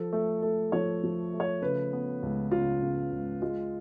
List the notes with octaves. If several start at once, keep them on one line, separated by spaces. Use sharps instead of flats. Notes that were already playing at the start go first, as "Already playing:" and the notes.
Already playing: F3 A4
A3
A3 A4
F3 C#5
F3
A3
C#5
C#3 B4
B3
C#2
C#3 F4
C#3
C#2
G#3 F4